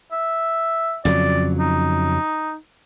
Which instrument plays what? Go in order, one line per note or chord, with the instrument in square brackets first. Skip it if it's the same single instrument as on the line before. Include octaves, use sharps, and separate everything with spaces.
[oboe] E5
[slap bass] F2 C#3 F#3 [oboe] D5
[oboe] D#4